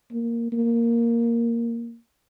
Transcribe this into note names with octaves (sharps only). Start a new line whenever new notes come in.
A#3
A#3